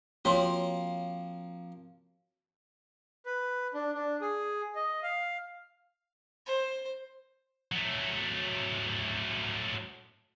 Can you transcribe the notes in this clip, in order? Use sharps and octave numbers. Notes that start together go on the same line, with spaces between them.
F3 A#3 C4 F#4 C#5 C6
B4
D4
D4
G#4
D#5
F5
C5
F#3 A3